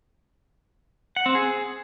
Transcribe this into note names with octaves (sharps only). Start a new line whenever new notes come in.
F#5
C4
G#4